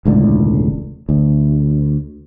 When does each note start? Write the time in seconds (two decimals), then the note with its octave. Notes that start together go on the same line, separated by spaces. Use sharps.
0.05 E1 C#2 A2 D3
1.09 D2